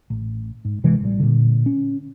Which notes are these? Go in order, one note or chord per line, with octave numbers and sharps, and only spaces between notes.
A1
G#2
D1 C3 E3 G#3
A1 A2 G3
A#2 D3
C#4